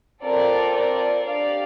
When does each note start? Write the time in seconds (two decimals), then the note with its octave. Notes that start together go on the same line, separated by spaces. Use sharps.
0.23 C4 F4 A4 A#4 D5
0.75 A#4 D5
1.25 D4 G4 D5 F5